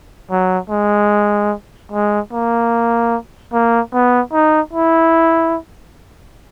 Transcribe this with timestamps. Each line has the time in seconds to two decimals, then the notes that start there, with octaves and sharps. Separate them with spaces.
0.30 F#3
0.70 G#3
1.92 G#3
2.32 A#3
3.53 A#3
3.93 B3
4.33 D#4
4.73 E4